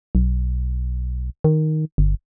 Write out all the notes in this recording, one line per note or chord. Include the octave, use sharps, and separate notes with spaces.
B1
D#3
G1